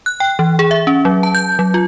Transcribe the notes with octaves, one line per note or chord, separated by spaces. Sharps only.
F#6
G5
E3
G#4
E5
C#4
F#3
A5
G6
F#3
F4